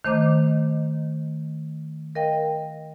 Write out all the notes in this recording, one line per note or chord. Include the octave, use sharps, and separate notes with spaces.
D#3 A3 C5 D#5 A#5 D6
A#4 D#5 F5 G5